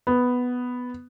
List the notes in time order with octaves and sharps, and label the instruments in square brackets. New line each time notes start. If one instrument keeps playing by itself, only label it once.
[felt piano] B3